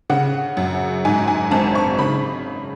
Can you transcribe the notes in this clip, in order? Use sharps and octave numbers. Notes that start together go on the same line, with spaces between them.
C#3 F#5
F#2
G#2 G#5
G#5
G#1 A5
C#6
C#3 B5